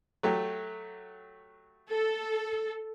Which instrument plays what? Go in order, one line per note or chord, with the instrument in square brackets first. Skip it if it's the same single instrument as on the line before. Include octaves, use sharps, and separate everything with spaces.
[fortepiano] F#3 A3 G4
[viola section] A4